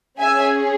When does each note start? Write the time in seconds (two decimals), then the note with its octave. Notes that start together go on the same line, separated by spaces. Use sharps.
0.20 C#4 G#4 E5 G#5